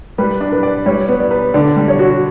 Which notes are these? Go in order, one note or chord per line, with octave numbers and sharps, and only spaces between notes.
G3 B4
D4
B4
D5
G3 C#5
B3
D5
B4
D3 D5
G3
C#5
F#4